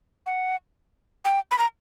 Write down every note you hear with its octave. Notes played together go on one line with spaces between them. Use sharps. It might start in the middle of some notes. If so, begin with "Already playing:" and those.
F#5
G5
B5
A#5